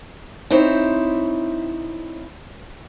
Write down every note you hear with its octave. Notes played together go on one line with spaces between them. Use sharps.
C4 D#4 E4 C5 C#5